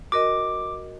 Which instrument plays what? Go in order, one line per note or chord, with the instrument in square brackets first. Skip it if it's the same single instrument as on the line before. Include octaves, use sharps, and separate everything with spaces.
[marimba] F#4 A#4 D#5 [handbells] D6